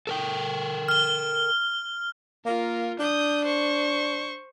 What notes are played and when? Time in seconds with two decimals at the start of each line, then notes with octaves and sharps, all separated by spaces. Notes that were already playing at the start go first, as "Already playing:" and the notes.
0.07 A4 A#4 G5
0.88 F6 G7
2.45 A#3 F4 A#4
2.99 D4 D#6 G6
3.45 C5 C#6